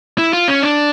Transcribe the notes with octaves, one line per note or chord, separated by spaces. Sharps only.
E4
F4
C#4
D4